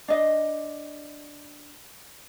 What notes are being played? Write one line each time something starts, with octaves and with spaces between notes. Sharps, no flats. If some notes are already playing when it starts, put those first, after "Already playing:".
D4 D#5